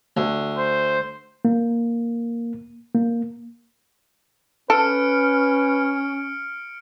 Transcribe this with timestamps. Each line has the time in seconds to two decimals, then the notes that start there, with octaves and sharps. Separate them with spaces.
0.17 D2
0.58 C5
1.45 A#3
2.95 A#3
4.70 C#4 A4 B4 F6 C#7 D7